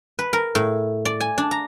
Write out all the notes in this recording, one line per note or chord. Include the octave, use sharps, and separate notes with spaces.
B4
A#4
A2
D5
G#5
D4
A#5